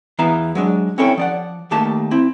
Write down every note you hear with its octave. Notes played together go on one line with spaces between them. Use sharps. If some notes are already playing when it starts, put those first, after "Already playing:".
E2 E3 B3 E5 F5 A#5
F#3 G#3 D4
C4 C#4 E4 A4 C#5 G5
F3 D5 F#5
D#2 A3 A#3 G4 A5
C4 E4